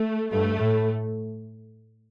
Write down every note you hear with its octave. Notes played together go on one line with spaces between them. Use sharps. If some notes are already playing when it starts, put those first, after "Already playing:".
Already playing: A3
G2 A3
A2